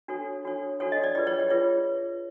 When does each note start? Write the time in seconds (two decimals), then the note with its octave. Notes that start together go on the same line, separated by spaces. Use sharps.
0.08 D4 F#4 A4 C#5
0.44 D4 F#4 A4 C#5
0.80 D4 F#4 A4 C#5
0.92 D#5
1.04 D5
1.15 F4 G#4 B4 D5
1.27 C#5
1.40 C#5
1.50 F4 G#4 B4 C#5